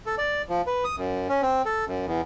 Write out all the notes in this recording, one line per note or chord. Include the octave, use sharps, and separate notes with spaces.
A4
D5
F3
B4
D#6
F#2
C#4
C4
A4
F#2
E2